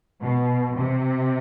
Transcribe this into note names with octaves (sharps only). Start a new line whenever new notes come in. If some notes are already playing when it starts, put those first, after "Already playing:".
B2
C3